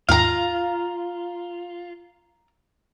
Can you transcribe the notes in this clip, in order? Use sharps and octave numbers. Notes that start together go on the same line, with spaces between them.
D#2 G#2 D#3 F4 F5 A#5